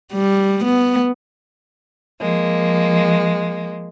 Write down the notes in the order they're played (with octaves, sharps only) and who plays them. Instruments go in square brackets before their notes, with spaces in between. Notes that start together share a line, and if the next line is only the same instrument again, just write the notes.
[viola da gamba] G3
B3
[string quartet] F3 G#3 A#3